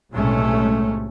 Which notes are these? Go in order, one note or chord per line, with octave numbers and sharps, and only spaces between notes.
B1 A2 C3 G#3 A3 C#4